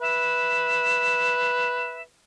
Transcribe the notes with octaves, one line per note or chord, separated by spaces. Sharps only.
B4 E5